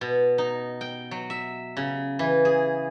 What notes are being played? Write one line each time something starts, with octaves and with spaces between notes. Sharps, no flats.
B2
D#4
G5
F#3
E5
C#3
E3
G#4